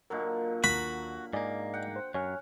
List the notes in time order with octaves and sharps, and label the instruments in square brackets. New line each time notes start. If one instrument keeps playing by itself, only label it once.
[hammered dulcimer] A#2 D3 F#3 [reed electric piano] A#4 D#5
[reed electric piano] D#2 [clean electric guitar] F#4 [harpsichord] B5
[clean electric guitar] G#2 A#3 [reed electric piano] D5 D#5 G#5
[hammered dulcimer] F#5 G5
[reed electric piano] C5
[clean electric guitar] F#2 [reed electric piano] C#5 G#5 F6